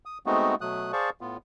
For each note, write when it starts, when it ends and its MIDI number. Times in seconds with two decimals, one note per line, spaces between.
0.05 0.18 87
0.26 0.55 56
0.26 0.55 57
0.26 0.55 59
0.26 0.55 60
0.26 0.55 63
0.26 0.55 66
0.61 0.92 47
0.61 0.92 54
0.61 0.92 57
0.61 0.92 87
0.61 0.92 90
0.93 1.10 68
0.93 1.10 72
0.93 1.10 74
0.93 1.10 77
0.93 1.10 81
0.93 1.10 85
1.21 1.37 45
1.21 1.37 59
1.21 1.37 65